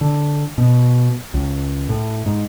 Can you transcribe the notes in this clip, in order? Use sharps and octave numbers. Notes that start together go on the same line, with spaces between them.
D3
B2
C#2
A2
G#2